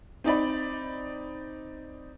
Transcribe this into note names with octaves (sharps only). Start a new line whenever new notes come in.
C4 D#4 D5 B5